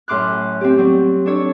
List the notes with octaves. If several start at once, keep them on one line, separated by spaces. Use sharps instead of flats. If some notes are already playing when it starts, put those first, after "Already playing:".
F#2 A2 C6 D6 F6 F#6
C4 G4
F#3 G3 C4
D4 A4 C#5